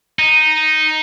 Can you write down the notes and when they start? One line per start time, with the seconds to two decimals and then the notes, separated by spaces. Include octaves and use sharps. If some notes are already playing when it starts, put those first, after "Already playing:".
0.19 D#4